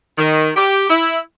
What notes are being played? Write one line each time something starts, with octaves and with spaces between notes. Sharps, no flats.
D#3
G4
E4